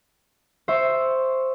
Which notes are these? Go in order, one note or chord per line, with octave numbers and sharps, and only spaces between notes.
C5 E5 C#6